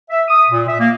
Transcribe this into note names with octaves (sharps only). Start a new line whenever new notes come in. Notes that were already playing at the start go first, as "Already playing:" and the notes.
E5
D#6
A#2
E5
A#3